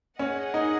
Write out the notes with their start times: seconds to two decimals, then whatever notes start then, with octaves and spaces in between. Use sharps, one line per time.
0.19 C#4 G#4 D#5 F#5
0.54 D#4